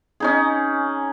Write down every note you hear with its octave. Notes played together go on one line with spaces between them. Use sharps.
C#4 D#4 G#4